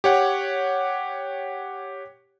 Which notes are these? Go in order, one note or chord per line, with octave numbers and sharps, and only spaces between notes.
G4 C#5 F#5